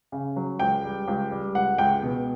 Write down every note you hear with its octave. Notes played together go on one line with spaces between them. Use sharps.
C#3
F#3
C#2 G5
G3
C#2
G3
C#2 F#5
C#2 G5
B2